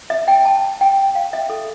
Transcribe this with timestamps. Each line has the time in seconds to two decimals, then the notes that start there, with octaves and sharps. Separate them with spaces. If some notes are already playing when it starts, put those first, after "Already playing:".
0.10 E5
0.28 G5
0.45 A5
0.81 G5
1.15 F5
1.33 E5
1.50 A4